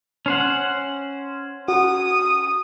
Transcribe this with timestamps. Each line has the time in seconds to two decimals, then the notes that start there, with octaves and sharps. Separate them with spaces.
0.26 C#4 C5 F#5
1.68 F#4 D#6